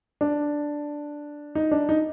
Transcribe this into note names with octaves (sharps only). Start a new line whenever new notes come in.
D4
D#4
D4
D#4